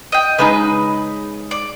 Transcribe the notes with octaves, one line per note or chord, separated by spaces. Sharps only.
D#5 G5
C#3 G#3 D#4 B4
D5